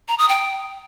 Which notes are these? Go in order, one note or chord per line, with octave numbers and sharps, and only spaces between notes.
A#5
D#6
G5